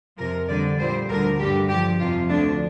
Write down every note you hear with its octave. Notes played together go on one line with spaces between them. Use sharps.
F2 C3 F3 A#4
F2 D3 G3 D5
A#2 G3 C5
D2 D3 G3 A#4
G2 D3 G3 G4
G2 F3 G4
F2 C3 F3 F4
D2 D3 F3 D4